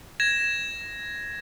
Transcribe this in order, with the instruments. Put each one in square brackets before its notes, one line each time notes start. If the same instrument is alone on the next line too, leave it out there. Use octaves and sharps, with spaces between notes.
[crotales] G#6 A#6 E7